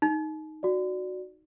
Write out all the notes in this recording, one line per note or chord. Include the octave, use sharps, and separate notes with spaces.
D#4
F#4 D5